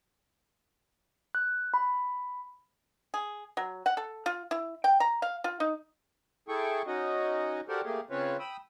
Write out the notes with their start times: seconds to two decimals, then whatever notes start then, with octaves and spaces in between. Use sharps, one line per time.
1.35 F#6
1.74 B5
3.14 G#4
3.57 F#3
3.86 F#5
3.97 A4
4.26 F4
4.51 E4
4.84 G5
5.00 A#5
5.22 F5
5.44 F4
5.60 D#4
6.48 E4 G#4 A4 G5 C#6
6.87 C#4 D#4 F#4 D#5
7.69 F#4 G4 A4 A#4 C5 D5
7.85 A3 A#3 G4 G#4
8.10 C#3 C4 C#4 F4 B4 C#5
8.39 G5 B5 D#6 E6